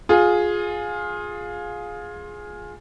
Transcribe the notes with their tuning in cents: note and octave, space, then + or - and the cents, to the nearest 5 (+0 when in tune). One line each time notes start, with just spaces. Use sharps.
F4 +20 G#4 +5